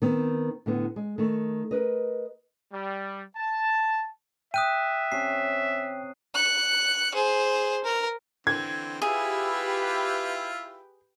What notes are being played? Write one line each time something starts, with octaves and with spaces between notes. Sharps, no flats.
D#3 B3 C4
A2 D3 B3
G#3
D#3 A3
A#4 B4 D#5
G3
A5
E5 G5 D#6 F#6 D#7
C3 C#4 C7
F#6 C#7
G#4 C5
A#4
D3 E3 C4 G#6
E4 F4 G4 G#4 B4 E5 G5